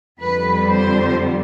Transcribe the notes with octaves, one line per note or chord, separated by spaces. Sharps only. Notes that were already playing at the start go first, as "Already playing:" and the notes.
F2 D3 G3 B4
C5